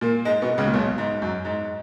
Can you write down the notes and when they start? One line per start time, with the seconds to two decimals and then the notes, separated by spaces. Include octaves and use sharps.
0.01 A#2 A#3
0.25 G#2 G#3
0.42 B2 B3
0.58 C#2 C#3
0.67 A#2
0.74 B1 B2
0.98 G#2
1.22 F#2
1.45 G#2